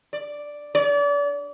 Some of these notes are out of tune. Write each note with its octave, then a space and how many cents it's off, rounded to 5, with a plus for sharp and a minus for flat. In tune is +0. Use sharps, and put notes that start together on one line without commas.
D5 +0
D5 -35